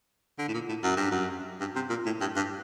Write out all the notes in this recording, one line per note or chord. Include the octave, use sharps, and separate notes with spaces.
D3
A2
A#2
A2
F#2
G2
F#2
G2
C3
A#2
A2
G2
G2